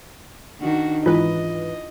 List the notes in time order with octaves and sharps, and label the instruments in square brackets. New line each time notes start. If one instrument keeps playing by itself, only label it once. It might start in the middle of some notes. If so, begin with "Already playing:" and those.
[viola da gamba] D#3 D4 F#4
[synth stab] G#2 E3 B4 [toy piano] E4 F4 [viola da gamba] D#5